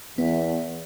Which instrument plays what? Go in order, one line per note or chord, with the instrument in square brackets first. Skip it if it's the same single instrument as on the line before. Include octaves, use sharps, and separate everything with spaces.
[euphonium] E2 [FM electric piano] B3